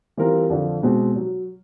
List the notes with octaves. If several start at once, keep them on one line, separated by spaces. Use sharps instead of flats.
E3 G3 C4 F4 A#4
F2 D3 F3
B2 G#3 C4
F#3